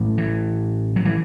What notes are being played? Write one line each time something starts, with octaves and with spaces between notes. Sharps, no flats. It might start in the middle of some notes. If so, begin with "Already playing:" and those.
Already playing: A1 A2
E3
F#3
E3